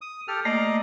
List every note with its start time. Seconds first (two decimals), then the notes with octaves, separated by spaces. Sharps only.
0.01 D#6
0.28 G4 A4 F6
0.45 A3 A#3 D5 D#5 A#5